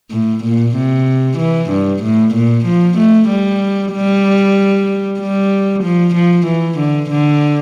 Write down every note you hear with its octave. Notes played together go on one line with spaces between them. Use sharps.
A2
A#2
C3
E3
G2
A2
A#2
F3
A3
G3
G3
G3
F3
F3
E3
D3
D3